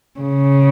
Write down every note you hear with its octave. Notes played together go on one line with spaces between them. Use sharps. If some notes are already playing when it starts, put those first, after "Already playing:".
C#3